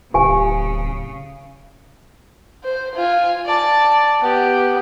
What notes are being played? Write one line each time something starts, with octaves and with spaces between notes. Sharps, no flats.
D1 C#3 G4 G#5
C5
F4 G#5
D5 A5
B3 G4